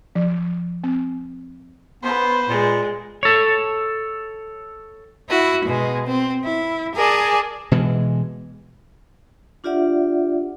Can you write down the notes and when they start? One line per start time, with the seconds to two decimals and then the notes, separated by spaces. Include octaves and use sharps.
0.15 F3
0.84 C4
2.03 B3 B4 C5
2.49 A#2 G#3
3.23 A4 C#5
5.29 E4 F#4
5.65 B2 G#3
6.07 C4
6.46 E4
6.95 G#4 A#4 D5 G#5 A5
7.72 B2 E3 G#3
9.64 D4 F4 G4 D5 E5 F#5